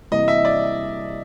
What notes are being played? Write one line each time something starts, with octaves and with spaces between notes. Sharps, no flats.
C3 E3 G3 A#3 D#5
E5
D5